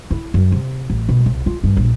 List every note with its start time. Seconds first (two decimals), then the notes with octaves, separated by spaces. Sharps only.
0.11 E4
0.34 F#2
0.52 C3
0.90 A1
1.09 B2
1.26 C2
1.46 F4
1.64 G2
1.77 A#1